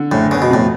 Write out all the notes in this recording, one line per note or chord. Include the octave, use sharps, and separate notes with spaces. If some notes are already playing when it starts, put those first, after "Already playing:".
Already playing: D3
F#1 A2
C#3 B3
B2
F2 A2